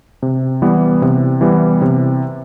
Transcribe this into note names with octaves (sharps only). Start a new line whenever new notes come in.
C3
E3 G3 B3
C3
E3 G3 B3
C3